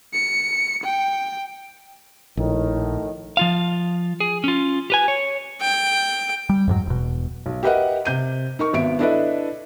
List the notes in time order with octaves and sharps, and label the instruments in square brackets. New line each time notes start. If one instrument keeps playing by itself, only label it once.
[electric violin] C#7
G5
[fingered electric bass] A#1 [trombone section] A2 D#3
[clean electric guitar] F3 F4 F5
G#4
C#4 F4
G4 B4 G#5
C#5
[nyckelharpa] G5
[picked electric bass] G3
F2 G#2 F#3
E1 B2
[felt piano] B1
G4 A#4 B4 D#5 E5 F#5
C3 G6 D#7
D#4 A#4 C#6
G#1 B3 E5 D7
D4 E4 A4 B4 D#5 E5